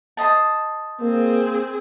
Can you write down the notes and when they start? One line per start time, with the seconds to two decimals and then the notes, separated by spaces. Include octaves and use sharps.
0.17 C5 D#5 A5
1.01 A#3 C4 G#4